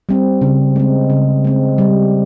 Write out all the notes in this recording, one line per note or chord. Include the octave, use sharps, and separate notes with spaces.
G3 C4
C#3
G#3 C4
C#3
G#3 C4
G3